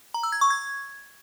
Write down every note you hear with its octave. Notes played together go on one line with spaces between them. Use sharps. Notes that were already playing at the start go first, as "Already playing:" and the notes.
A#5
E6
G#6
C#6
G#6